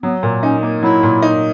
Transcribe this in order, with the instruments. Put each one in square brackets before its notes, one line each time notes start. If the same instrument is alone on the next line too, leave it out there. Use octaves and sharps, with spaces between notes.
[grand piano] F#3 [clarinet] B3
[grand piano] A#2
[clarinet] C#4 [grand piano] D#4
[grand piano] A#3
[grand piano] F#3 [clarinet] E4
[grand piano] A#2
D#4